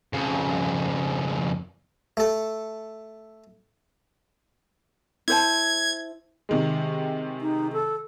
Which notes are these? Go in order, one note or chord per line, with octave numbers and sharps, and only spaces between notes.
F2 C#3
A3 A4
E4 C5 A5 G#6
C3 D#3 G#3
D#4
A4